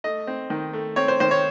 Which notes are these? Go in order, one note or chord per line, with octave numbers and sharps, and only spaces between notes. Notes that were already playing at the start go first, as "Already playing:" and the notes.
A3 D#5
C4
D#3
A3
C4 C#5
C5
D#3 C5
C#5